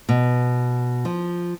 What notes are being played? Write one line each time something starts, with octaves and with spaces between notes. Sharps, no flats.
B2
F3